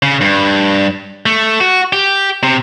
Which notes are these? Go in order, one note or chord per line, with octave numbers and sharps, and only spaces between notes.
C#3
G2
A3
F#4
G4
C3